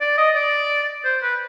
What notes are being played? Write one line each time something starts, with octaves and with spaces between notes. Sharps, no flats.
D5
D#5
D5
C5
B4